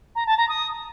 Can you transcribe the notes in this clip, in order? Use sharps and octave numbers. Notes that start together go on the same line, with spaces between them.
A#5
A5
A#5
D#6